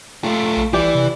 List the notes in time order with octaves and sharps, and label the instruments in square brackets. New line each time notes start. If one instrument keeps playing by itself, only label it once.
[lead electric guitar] A3 F4
[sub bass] A#1
[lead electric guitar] E3 [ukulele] G4 D5
[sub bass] C3